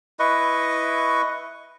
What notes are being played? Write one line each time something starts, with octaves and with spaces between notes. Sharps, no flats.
E4 B4 D#5 C#6